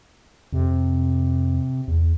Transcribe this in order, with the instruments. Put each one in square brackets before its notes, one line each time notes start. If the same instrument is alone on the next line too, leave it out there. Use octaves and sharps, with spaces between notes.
[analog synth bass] F2 [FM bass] C3
[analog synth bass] E2